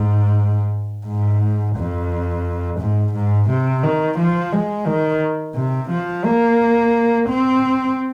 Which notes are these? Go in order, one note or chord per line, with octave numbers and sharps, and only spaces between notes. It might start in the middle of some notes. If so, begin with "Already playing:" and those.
Already playing: G#2
G#2
F2
G#2
G#2
C3
D#3
F3
G#3
D#3
C3
F3
A#3
C4